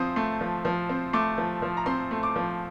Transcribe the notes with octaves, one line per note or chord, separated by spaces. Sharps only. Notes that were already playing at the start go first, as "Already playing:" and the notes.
Already playing: F3 C4 D#6
A3
F3
F3
C4
A3 D6
F3
F3
A#5
C4 C6
A3
D6
F3